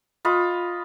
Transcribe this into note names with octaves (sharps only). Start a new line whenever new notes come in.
F4 D#5 B5